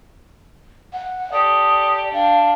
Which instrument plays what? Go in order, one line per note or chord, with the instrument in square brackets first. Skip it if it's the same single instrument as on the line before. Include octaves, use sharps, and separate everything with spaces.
[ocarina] F#5
[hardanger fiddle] G4 A4 [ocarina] D5 [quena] D#6
[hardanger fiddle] D4 [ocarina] F5 [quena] G5